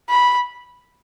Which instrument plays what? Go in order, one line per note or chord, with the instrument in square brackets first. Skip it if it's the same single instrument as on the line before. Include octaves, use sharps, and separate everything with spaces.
[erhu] B5